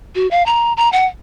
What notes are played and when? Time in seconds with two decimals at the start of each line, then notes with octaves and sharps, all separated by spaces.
0.15 F#4
0.31 F5
0.46 A#5
0.77 A#5
0.92 F#5